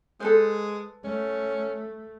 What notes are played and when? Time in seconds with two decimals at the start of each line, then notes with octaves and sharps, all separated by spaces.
0.20 G#3 A4 B4 C5
1.04 A3 C#4